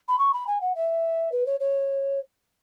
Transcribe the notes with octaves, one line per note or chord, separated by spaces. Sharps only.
B5
C#6
B5
G#5
F#5
E5
B4
C#5
C#5